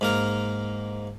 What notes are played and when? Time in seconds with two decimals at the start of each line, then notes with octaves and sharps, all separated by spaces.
0.01 G#2 A#3 A#4